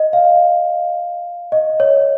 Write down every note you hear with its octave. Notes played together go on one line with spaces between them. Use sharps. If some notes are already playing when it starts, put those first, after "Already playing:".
Already playing: D#5
F5
D#5
C#5